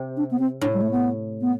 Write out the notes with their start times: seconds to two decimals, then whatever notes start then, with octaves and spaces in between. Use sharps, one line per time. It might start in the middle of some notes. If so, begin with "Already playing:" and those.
Already playing: C3
0.17 D4
0.31 B3
0.39 C4
0.61 A2 D4
0.74 G3
0.82 A3
0.91 B3
1.41 B3